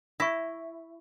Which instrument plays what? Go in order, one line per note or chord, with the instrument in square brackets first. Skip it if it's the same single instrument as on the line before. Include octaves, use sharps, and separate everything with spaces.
[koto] E4 [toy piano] E5 C#6